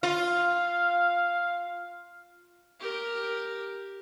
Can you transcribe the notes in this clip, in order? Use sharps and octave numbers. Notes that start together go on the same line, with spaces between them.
F4 F5
G4 A#4